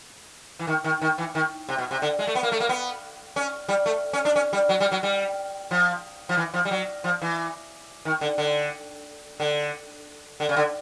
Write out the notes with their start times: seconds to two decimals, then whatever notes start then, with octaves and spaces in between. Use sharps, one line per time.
0.59 E3
0.67 D#3
0.84 D#3
1.02 D#3
1.18 E3
1.35 D#3
1.69 C3
1.79 B2
1.91 C3
2.02 D3
2.19 G#3
2.27 A3
2.35 B3
2.43 A#3
2.52 A3
2.60 A#3
2.69 B3
3.36 C#4
3.69 G3
3.86 A3
4.13 C#4
4.25 D4
4.36 C#4
4.53 G3
4.69 F#3
4.80 G3
4.92 F#3
5.03 G3
5.71 F3
6.29 F3
6.37 E3
6.54 F3
6.65 G3
6.71 F#3
7.04 F3
7.22 E3
8.05 D#3
8.21 D3
8.38 D3
9.40 D3
10.40 D3
10.49 C#3
10.57 D3